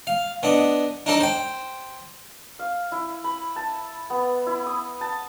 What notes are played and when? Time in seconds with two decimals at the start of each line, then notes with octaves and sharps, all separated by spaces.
0.07 F5
0.43 B3 D4 D#5
1.06 D4 D#4 A4 D5
1.20 C5 G5
2.59 F5
2.92 E4
3.24 B5
3.56 A5
4.10 B3
4.47 E4
4.66 D#6
5.01 A5